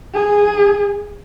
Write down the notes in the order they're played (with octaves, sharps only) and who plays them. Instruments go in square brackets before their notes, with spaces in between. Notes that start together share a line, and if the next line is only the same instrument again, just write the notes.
[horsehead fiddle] G#4